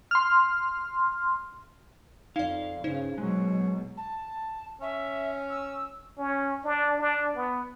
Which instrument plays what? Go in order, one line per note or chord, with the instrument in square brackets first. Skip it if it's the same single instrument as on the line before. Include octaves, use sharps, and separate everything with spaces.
[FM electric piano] C6 F6
[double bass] F2 [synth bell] D#4 D5 [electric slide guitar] F5
[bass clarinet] G2 [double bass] C#3 [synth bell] D#4 C5
[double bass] B2 [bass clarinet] F#3 [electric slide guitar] G#3
[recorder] A5
[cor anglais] C#4 [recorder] E5
[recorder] E6
[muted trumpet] C#4
D4
D4
B3